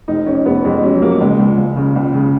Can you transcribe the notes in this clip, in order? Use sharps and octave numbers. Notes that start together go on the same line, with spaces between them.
F1 D#4
F2 C#4
F1 B3
F2 G#3
F#3 C#4
F#3 A#3
C#2 G#3
C#2
C#2
C#3
C#2
C#3